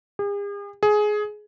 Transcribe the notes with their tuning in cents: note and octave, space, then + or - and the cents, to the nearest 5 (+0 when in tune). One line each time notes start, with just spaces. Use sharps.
G#4 -45
G#4 +15